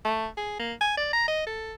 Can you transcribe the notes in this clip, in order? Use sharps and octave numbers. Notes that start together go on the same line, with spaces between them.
A3
G#4
A#3
G#5
D5
A#5
D#5
A4